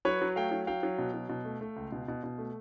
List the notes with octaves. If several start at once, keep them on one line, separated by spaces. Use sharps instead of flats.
F#3 B4 C#5
F#3
A3 F5 G5
F#3
F#3 F5 G5
F#3
B2
F#3
B2
A3
A3
C#2
B2
B2
B2
A3